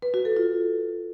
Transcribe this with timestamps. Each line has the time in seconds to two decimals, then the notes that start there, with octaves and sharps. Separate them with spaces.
0.02 B4
0.14 F#4
0.25 A4
0.37 F4